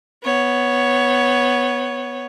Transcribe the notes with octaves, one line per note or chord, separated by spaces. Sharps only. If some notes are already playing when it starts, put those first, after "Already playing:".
B3 C#5